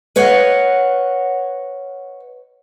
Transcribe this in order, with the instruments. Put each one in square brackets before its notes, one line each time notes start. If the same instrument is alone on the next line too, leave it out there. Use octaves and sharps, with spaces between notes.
[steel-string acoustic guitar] B4 C#5 D#5 F5 F#5